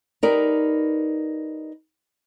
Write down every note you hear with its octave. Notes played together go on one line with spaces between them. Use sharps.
D#4 G4 A#4 B4 D5